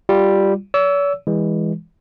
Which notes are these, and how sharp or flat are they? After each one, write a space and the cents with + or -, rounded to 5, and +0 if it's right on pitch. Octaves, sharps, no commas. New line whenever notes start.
G3 +0 F4 +0
C#5 +45 E6 +0
E3 -10 G#3 -30